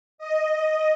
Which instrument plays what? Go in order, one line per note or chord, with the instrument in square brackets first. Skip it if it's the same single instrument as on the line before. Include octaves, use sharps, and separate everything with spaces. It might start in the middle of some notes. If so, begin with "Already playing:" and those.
[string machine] D#5